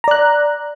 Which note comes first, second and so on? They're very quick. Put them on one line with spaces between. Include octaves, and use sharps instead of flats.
A#5 D5 F#6